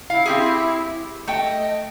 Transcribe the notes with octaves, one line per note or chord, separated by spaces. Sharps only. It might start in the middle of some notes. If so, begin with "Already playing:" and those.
E4 F5
C4 G4 G#4
A3 D#5 G5